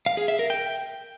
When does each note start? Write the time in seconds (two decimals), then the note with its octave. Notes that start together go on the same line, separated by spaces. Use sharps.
0.06 F5
0.17 G#4
0.28 E5
0.39 A#4
0.50 G5